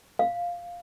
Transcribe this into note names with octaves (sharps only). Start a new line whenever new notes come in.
F5